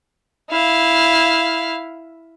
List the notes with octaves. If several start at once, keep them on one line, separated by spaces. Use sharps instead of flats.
E4 F5